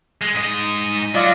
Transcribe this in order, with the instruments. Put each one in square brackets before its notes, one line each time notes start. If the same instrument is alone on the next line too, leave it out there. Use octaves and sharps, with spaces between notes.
[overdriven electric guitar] G#3
G#2 D#5
[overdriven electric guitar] F#3 [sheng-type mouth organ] F4 D5 D#5